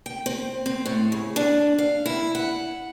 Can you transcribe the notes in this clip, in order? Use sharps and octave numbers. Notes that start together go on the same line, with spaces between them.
G5
C4
C4
A2
C#3
D4
F5
E4
F#5